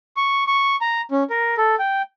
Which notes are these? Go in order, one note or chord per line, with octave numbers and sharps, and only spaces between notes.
C#6
C#6
A#5
C#4
A#4
A4
G5